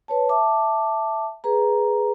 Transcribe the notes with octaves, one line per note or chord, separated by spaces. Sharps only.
B4 C#5 A5
E5 A5 D6
G#4 B4 A#5